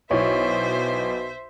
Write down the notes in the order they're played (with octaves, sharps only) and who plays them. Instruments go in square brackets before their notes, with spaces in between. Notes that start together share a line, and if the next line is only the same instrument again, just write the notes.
[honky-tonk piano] B1 [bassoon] B2 [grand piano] E4 C#5 [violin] C5 E5